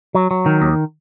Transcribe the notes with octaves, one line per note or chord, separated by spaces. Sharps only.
F#3
F#3
D#3
D#2